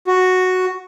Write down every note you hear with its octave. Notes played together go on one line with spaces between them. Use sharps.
F#4